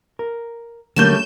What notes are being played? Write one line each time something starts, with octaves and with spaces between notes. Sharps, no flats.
A#4
D3 F#3 G3 A3 A#3 C#4 G6 E7